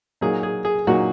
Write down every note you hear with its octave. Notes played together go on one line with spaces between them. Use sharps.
A#2 F#3 A#3 D#4 G#4
G#4
G#4
A#2 F#3 A#3 D#4 F#4